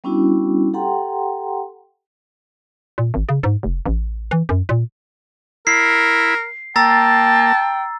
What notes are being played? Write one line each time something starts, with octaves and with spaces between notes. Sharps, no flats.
G3 B3 C#4 D4 E4 F#4
G4 A4 F#5 G5 A#5 C6
A#2
G#1
C#3
G#2
F1
A1
E3
F#2
A#2
E4 A#4 B5 C7
A#3 G5 A5 A#5 E6 A6